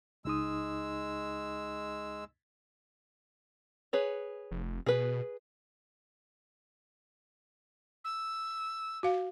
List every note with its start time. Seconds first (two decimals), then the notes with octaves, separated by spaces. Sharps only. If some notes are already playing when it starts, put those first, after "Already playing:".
0.25 C#2 G#3 D#4 D#6 E6
3.93 G#4 B4 C#5
4.51 F1
4.86 B2 G#4 B4
8.04 E6
9.03 F#4 F5